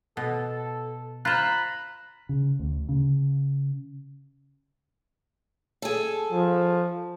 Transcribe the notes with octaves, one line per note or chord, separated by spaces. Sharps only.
B2 A4
F4 C5 A#5 B5 F#6
C#3
D2
C#3
G#4 A4
F3